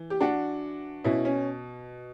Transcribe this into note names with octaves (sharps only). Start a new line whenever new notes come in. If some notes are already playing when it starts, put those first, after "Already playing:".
Already playing: E3
G4
D4 F#4
B2 C#4 E4
C#4